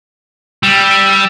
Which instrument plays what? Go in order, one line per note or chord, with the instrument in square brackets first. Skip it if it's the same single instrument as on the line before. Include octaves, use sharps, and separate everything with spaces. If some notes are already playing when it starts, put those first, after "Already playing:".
[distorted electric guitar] G3 [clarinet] E6